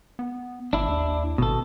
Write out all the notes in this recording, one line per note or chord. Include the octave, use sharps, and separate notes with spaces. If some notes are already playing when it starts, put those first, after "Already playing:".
B3
G#1 D4 E4
D#2
G#1 B2 A4